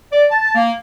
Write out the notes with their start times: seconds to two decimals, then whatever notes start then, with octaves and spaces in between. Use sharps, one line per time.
0.12 D5
0.31 A5
0.55 A#3